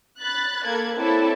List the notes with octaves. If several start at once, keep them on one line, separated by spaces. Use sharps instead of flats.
B5 F#6 A6
A#3 A4 G#6
C4 E4 A4 C#5 D5 A5